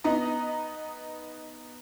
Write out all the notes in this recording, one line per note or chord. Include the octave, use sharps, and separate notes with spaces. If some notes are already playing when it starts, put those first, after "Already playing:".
B3 D#4 D#5 A#5